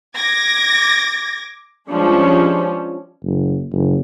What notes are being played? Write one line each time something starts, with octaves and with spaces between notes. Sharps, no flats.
D6 G#6 A#6
F3 G3 G#3 C#4 D4
F#1
F#1